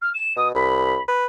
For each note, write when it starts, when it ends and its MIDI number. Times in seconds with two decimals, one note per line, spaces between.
0.01 0.10 89
0.14 0.33 100
0.36 0.53 47
0.36 0.48 87
0.55 0.97 36
0.55 1.01 83
1.08 1.26 71